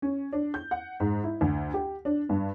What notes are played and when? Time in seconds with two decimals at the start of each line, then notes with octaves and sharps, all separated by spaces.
0.02 C#4
0.33 D4
0.54 G6
0.71 F#5
1.00 G#2
1.24 E4
1.41 D2
1.74 G4
2.05 D4
2.29 G2